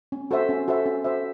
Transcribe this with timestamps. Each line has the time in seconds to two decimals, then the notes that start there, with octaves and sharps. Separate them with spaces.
0.12 C#4
0.31 F#4 A4 C5 E5
0.49 C#4
0.68 F#4 A4 C5 E5
0.86 C#4
1.04 F#4 A4 C5 E5